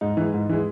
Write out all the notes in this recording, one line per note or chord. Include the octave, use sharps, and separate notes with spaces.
G#2 D#4
E3 G#3
G#2
E3 G#3